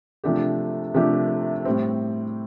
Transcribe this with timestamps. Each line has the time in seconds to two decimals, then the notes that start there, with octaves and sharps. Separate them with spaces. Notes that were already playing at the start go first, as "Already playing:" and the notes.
0.24 C3 F3 A3 D4 G4
0.94 C3 F3 A3 D4 G4
1.65 A2 G3 C4